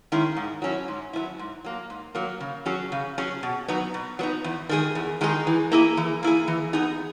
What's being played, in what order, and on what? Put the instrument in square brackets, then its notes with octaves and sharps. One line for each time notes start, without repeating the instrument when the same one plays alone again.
[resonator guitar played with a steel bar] D#3 G#3 C#4 E4
G#2
F#3 C#4 E4
G#2
F#3 C#4 E4
G#2
F#3 A#3
G#2
F#3 A#3
C#3
F#3 C#4 G#4
C#3
F#3 C#4 G#4
B2
F#3 B3 D#4
B2
F#3 B3 D#4
E2
D#3 G#3 D#4 G#4
E2
D#3 G#3 D#4 G#4
E3
A#3 E4 G#4
E3
A#3 E4 G#4
E3
B3 D#4 G#4